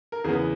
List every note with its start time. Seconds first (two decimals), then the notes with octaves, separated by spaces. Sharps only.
0.12 A#4
0.24 E2 C#3 E3 B3 G#4